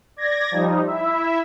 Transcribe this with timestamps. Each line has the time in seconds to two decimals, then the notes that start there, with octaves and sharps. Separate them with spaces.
0.16 D5 G#6 A#6
0.51 F3 G3 D#4
0.86 E4 E5